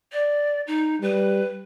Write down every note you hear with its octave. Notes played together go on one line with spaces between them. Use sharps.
D5
D#4
G3 B4